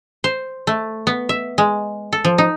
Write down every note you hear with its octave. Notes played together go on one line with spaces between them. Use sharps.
C5
A3
B3
E5
G#3
A4
F3
D#4